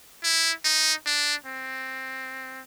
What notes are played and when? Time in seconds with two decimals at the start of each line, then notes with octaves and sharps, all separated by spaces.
0.24 E4
0.64 D#4
1.06 D4
1.46 C4